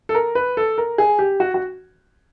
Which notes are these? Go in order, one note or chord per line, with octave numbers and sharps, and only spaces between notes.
A4
A#4
B4
A4
A#4
G#4
G4
F#4
F#4